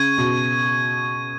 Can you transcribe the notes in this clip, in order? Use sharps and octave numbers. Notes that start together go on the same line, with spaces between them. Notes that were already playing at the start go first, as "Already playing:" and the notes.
Already playing: C#3 C#6 G#6 D#7
B2